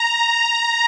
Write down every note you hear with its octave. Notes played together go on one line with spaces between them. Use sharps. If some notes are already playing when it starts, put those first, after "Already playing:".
Already playing: A#5